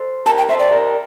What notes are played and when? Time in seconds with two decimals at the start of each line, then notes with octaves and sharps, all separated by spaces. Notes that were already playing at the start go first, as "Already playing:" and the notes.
Already playing: A4 C5
0.26 G4 A#4 A5
0.38 G5
0.49 A4 C5 E5
0.60 D5
0.71 G4 A#4